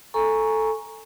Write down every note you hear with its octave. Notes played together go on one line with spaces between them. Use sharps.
A4 G#5 A#5 C#6